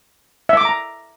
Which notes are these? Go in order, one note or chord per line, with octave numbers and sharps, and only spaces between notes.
E5
D6
A#5